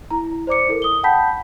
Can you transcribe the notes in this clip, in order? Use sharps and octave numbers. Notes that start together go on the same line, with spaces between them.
E4 A#5
C5 D5 D6 C#7
E4 A4 A#4
D#6 G7
F#5 G5 A5 B5 G6 B6